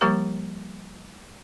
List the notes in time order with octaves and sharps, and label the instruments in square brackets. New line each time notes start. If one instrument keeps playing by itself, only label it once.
[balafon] F3 G3 A#3 G4 A#4 A#5